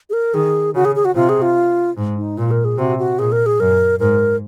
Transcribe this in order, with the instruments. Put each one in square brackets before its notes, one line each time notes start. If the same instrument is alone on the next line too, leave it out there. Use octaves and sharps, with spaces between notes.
[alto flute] G#4
A#4
[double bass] D#3 [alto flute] G#4
[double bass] C#3 [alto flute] F#4
[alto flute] G#4
G#4
F#4
[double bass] C3 [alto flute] F4
[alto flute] G#4
F4
[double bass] G#2
[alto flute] D#4
[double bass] A#2 [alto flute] F4
[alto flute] A#4
G#4
[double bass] C3 [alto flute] F#4
[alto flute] F#4
[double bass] A#2 [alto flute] G#4
[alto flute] A#4
G#4
[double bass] F#2 [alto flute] A#4
[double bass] G#2 [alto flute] A#4